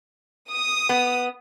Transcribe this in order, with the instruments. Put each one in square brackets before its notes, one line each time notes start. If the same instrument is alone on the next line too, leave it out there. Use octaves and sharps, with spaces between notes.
[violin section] D#6
[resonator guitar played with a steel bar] B3